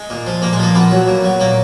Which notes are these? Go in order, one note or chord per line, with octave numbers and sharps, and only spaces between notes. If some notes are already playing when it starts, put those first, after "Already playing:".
Already playing: G#3
A#2
F3
A#2 A#3
G#3
F3 A#3
A#2 B3
F#3
A#2
F#3
A#2 A#3